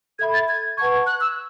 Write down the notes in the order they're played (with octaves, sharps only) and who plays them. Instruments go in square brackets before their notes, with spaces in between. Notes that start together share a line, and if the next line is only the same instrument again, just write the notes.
[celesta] A4 E5 B5 [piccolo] G#6
[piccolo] A6
G#6
[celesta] B4 F#5 A5 C#6 [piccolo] G#6
[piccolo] F#6
E6